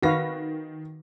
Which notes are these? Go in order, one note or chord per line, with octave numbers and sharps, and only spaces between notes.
D#3 F#4 B4 F5 A#6